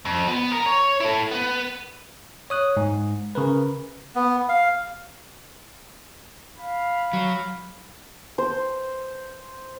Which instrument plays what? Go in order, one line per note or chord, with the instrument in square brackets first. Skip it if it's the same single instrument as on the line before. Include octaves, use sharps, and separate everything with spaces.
[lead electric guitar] F2
B3
A#4 A#5
C#5
E4 A4
B3 B4
[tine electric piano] C#5 D#6 F#6
G#2
C#3 A#4 B4
[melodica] B3
F5
[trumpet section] F5 B5
[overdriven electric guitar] F#3
[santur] C5